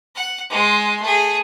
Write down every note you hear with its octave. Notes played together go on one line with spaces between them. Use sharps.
F#5
G#3 C6
A3 G#4